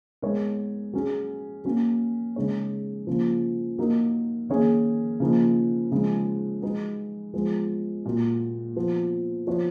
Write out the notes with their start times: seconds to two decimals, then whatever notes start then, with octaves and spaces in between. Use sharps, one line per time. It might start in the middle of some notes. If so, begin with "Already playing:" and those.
0.22 G#3 B3 D#4 A#4 C#5
0.93 F#3 C#4 G#4
1.65 F#3 A#3 C#4 F#4
2.36 C#3 G#3 D#4 G#4 C#5
3.07 C#3 F3 A#3
3.78 F#3 A#3 D#4 A#4
4.49 D#3 A#3 C#4 G#4 C#5
5.20 C#3 F3 A#3 D#4
5.92 C#3 F3 G#3 D#4
6.62 G#3 D#4 F#4 B4
7.34 F3 G#3 B3
8.05 A#2 F#3 A#3
8.76 F3 B3 F#4
9.47 F3 B3 F#4 C#5